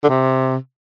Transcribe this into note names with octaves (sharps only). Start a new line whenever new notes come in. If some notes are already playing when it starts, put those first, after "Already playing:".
D3
C3